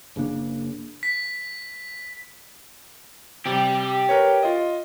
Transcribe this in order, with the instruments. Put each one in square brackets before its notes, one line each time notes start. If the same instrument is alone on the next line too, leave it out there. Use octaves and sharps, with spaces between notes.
[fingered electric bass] F#1 C#3 A#3 D4
[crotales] B6
[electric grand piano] C3 [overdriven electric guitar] G4 D5
[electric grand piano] A#4 B4 C#5
F4 D#5